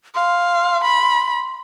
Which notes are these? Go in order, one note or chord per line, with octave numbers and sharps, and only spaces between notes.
F5 C6
B5